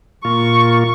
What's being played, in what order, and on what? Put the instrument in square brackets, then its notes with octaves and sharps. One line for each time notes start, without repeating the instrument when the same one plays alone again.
[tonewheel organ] A#2 A#3 F4 [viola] C#6